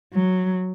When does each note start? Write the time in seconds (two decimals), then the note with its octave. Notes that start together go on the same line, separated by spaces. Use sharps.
0.13 F#3